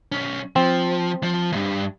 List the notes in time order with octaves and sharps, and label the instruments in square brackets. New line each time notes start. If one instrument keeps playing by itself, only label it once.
[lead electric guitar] B1 C#4
[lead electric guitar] F3 [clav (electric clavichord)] C4
[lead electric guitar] F3
E2 G2